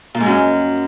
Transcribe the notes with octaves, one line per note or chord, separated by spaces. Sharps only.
A#2
G#2
F#2